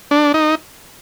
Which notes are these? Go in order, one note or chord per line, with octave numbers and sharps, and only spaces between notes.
D4
D#4